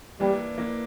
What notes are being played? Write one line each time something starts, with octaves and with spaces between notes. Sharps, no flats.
E3 G3 A#3 D4
E3 A#3 D4